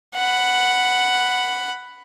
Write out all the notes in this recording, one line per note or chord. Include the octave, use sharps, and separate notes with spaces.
F#5 B5